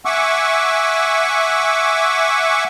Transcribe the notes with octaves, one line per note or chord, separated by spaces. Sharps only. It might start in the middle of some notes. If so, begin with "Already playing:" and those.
E5 F#5 G#5 C#6 D6 E6